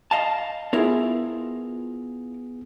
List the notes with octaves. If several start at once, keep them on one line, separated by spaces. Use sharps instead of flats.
D#5 F5 A5
B3 E4 F4 G#4 A#4